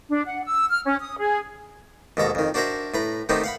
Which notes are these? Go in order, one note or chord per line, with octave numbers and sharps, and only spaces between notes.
D4
F#5
E6
F6
C#4
D#6
G#4
D#2 G#2 B2 A4 A#5
F2 D#3
D4 F#4 A#4 C5 E5 A#5
A2 B4 A#5
D#3 A3 B3 C4 D#4 G4
F5 F#5 B5